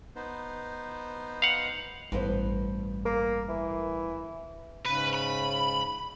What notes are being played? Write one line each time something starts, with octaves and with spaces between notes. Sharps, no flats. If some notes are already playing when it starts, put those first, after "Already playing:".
B3 D#4 C5
F5 F#5
A1 G2 B3 C5
A#3
E3
G#2 C#3 B4
B5